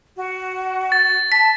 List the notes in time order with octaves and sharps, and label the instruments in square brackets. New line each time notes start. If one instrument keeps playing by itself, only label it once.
[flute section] F#4
[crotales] A6
[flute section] A5 [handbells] B6